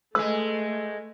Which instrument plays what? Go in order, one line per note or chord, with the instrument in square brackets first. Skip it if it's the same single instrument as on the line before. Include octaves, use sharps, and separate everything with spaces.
[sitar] G#3 B4 [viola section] A3 [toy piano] E6